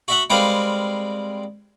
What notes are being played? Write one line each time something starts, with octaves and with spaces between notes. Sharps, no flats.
F#4 E5 F#5
G3 G#3 C4 A#4 B4 F5